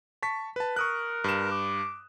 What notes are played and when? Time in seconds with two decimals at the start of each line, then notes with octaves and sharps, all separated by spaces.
0.22 A5 C#6 B6
0.56 B4 A5
0.76 A#4 C#6 D#6 F#6
1.24 G2 E7
1.51 D6